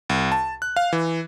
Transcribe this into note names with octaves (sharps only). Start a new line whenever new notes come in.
C2
A5
F#6
F5
E3